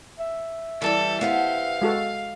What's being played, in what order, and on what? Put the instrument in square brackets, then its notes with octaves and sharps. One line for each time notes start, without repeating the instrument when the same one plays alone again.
[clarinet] E5
[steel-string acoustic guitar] E3 G3 G4 [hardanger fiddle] A4
[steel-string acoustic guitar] B3 G4 C5 [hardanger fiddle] F5
[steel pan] G#3 F#4 A4